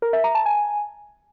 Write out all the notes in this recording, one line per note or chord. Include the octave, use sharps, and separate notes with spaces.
A#4
E5
A#5
A5
G#5